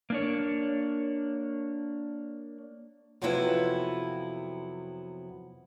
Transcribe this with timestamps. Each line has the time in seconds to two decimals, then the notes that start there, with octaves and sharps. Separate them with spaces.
0.10 A#3 D4 C#5
3.22 F2 C3 F3 F#3 B3 E4